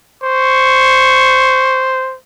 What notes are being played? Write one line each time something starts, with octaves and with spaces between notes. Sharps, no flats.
C5 C#6